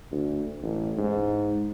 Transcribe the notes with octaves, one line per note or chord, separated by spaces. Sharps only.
D2
A1
G#2